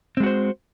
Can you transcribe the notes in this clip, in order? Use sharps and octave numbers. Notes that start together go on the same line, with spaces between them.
G#3 C4 F#4 C5